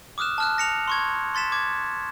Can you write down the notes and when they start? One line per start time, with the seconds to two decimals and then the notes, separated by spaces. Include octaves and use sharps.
0.18 D6 D#6 F6 F#6 E7
0.38 A5 F6 F#6
0.58 A#6 C#7 F7
0.88 C6 C#6 G#6
1.35 C6 A6 B6 E7
1.52 D6 G#6